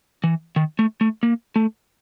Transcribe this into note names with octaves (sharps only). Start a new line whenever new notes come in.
E3
D#3
A3
A3
A#3
A3